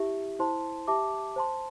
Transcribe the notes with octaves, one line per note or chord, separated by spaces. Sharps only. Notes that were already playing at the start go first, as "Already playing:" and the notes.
Already playing: E4 G4 E5
E4 C5 A5 C6
G4 E5 A5 D6
C5 A5 C6